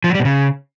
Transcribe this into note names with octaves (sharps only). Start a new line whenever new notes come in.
F3
F#3
G3
B2
C#3